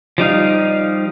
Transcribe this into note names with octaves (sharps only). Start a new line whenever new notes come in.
F3 G3 D#4 F5